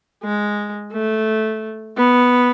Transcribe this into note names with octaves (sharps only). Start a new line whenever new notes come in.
G#3
A3
B3